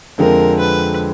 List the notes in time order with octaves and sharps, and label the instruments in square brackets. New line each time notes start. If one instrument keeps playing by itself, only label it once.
[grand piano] F2 D3 F3 G#3 C4 [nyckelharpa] A#4
[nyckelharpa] B4